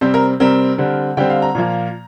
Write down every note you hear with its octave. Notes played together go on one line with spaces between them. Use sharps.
C3 G3 C4 C5
A#4
C3 G3 C4 A#4
D3 G3 C4
D3 G3 C4 G5
F5
A#5
A#2 F3 A#3